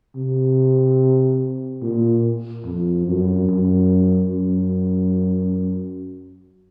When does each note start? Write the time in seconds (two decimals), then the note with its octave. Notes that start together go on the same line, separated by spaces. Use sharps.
0.16 C3
1.82 A#2
2.65 F2
3.07 F#2
3.49 F#2
4.32 F#2